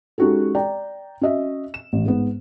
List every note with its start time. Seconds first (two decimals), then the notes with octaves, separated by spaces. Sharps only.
0.18 G#3 C#4 D#4 F#4 G4 A4
0.55 D5 G5 A#5
1.21 C#4 F#4 D#5 E5
1.74 E7
1.93 A1
2.05 G#2 B3